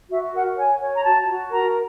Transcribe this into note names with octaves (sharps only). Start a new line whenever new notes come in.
F#4 E5
A#4 F#5
C#5 G#5
C#5
A#5
F#4 A5
F#4
A#4 A#5